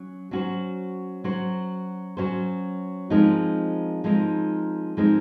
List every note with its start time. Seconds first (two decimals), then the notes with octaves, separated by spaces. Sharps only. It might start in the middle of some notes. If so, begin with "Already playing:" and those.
Already playing: F#3 C#4
0.31 F#3 C#4 F#4 C5
1.24 F#3 C#4 F#4 C5
2.17 F#3 C#4 F#4 C5
3.10 F3 G#3 C4 D#4 A#4
4.04 F3 G#3 C4 D#4 A#4
4.97 F3 G#3 C4 D#4 A#4